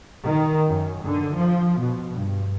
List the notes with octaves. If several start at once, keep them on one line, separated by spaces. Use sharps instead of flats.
D#3
F#2
D3
F3
B2
G2